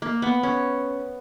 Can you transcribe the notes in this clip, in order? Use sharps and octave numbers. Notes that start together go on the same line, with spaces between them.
A#3
B3
C#4